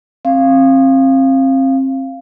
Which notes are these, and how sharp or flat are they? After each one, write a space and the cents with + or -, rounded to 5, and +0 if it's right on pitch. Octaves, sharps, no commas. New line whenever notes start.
C4 +30 F5 -10